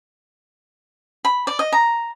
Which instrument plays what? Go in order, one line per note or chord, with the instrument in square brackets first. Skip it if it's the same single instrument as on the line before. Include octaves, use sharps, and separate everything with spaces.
[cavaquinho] B5
D5
D#5
A#5